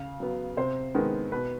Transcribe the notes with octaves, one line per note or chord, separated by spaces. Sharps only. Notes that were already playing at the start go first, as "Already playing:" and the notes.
Already playing: C#3 F5
F#3 B3
C3 C5
D#3 G#3 B3
B2 B4